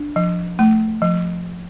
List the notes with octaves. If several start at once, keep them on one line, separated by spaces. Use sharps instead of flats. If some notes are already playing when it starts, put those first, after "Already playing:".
Already playing: D4
F3
A3
F3